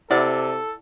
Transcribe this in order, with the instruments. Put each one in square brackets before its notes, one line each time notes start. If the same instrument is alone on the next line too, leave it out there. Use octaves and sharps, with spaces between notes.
[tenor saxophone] C3 [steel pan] E4 F#5 [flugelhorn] A4 [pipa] D5